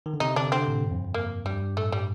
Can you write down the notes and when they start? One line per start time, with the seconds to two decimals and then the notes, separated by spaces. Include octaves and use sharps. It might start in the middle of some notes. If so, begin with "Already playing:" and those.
0.06 D#3
0.14 D3
0.20 C3 D#4
0.36 D3 D4
0.52 D3 C4
0.68 A2
0.84 G2
0.91 F2
1.05 F2
1.14 A#3
1.46 G2 G3
1.61 G2
1.77 A2 A3
1.92 G3